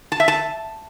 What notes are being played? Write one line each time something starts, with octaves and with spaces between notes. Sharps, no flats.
A5
E5
A5